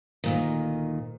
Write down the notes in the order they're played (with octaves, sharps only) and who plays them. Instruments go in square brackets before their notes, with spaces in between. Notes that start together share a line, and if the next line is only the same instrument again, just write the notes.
[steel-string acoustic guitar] D2 A#2 D#3